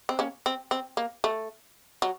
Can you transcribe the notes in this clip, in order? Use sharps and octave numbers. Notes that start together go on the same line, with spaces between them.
C4
A#3 C#4
C4
C4
A#3
A3
F#3